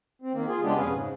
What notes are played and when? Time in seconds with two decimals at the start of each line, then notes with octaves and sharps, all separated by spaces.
0.22 C4
0.33 D#3 A#3
0.48 F4 G#4
0.63 C#3 G#3 B3 D4 G4
0.77 F2 B2 C#4 G#4 B4 F5
0.91 G#2 C#3